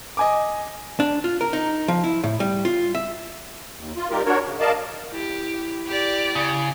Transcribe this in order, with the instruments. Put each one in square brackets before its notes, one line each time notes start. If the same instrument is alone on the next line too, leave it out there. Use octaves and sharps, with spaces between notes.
[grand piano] D#5 G#5 D6
[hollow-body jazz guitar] D4
F4
A#4
D#4
F3
E4
A2
G3
F4
E5
[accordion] D#2
F4
G3 D#4 F4 G4 A#4
D4 F#4 A#4 C#5
C#3
A#4 D5 D#5 F5 A5
[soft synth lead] E4 [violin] G4
[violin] G4 D5
[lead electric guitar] C#3